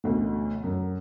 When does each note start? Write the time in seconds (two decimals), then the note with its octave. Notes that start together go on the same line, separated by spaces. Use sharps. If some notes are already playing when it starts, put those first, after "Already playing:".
0.04 A1 D2 B2
0.64 F#2